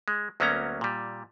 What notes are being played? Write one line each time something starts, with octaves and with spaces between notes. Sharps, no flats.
G#3
D2 F#3 A#3 B3 C#4 A#5
A#2 G3